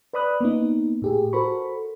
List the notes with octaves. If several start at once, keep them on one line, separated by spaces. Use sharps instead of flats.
B4 D5 B5 D#6 F#6
A#3 B3 D#4
A2 G4 G#4
F#4 A4 A#4 C5 B5 C#6